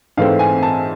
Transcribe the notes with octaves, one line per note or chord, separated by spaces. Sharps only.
G#2 E3 A3 C4 F5
G#5
A5